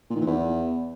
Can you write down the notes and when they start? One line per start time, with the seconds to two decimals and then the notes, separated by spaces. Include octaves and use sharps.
0.10 A#2
0.15 D#3
0.21 E3
0.27 E2